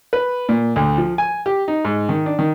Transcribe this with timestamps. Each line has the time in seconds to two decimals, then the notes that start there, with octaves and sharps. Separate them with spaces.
0.13 B4
0.49 A#2
0.76 D2
0.98 F3
1.18 G#5
1.46 G4
1.68 D#4
1.85 G#2
2.09 D#3
2.26 D4
2.39 D#3